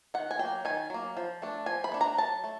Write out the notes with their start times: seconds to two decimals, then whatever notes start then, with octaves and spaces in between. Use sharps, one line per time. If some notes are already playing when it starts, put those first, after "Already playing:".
0.14 D#3 F#5
0.31 G#5
0.39 F#3 A#3 G5
0.65 D#3 G#5
0.90 F#3 A#3
1.17 F3
1.42 A3 D4
1.66 F3 G#5
1.84 B5
1.92 A3 D4
2.01 A#5
2.17 F#3 A5
2.44 A3